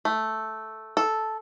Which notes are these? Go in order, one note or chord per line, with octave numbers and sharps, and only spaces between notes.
A3
A4